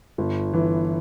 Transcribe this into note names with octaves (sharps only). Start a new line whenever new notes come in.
G1
E3